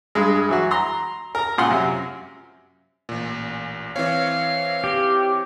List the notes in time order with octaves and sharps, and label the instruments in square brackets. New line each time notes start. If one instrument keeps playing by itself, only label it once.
[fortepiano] G2 G#3
E3 F#3 F#4
A#5 C6
A#4 A#5
C#2 A#2 F4 F#5 C6
F#2 C3
[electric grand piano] A1 A#2
[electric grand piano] E3 C4 C#5 [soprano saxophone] F5
[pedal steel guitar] G4